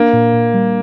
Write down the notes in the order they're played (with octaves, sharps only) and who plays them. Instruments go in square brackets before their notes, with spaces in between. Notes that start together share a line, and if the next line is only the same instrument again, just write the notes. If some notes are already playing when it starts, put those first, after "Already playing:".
Already playing: [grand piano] A#3 [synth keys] D4
[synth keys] A#2
A#2
G3